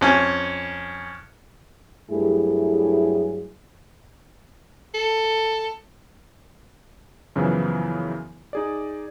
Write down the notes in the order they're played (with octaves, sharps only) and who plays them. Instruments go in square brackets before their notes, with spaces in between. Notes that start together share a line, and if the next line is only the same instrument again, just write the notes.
[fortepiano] F2 C#4 G#5
[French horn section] G2 F#3 A3 E4 G4 G#4
[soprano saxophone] A4
[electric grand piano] F#2 C#3 E3 F3 B3 E4
D#4 G#4 D5